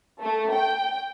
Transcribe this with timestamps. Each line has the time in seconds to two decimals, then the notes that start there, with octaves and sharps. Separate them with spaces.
0.21 A3
0.53 G5